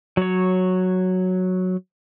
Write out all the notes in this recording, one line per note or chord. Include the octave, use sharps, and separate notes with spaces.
F#3 C#5